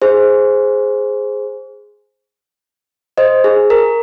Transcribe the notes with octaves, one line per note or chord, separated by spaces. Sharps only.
G#4 C5
C5 D#5
G#4
A#4